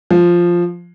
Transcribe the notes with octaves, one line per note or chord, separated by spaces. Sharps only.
F3